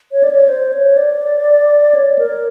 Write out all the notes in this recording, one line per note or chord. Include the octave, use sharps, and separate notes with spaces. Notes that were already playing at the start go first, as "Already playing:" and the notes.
C#5
D5
C#5
C5
C#5
D5
C#5
A#4